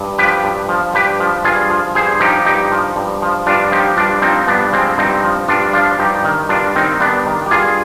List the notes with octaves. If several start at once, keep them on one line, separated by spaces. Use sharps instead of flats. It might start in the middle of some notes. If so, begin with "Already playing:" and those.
Already playing: G2
F3 G4 B4
G2
F3
G2 G4 B4
F3
G2 F4 G#4
F3
G2 G#4 C5
F3 D#4 G4
G2 D#4 G4
F3
G2
F3
G2 D4 F4
F3 D#4 G4
G2 D4 F4
F3 C4 D#4
G2 B3 D4
F3 G#3 C4
G2 C4 D#4
F3
G2 D4 F4
F3 D4 F4
G2 D#4 G4
D#3
G2 D4 F4
D#3 C4 D#4
G2 B3 D4
D#3
G4
G2 F4 G#4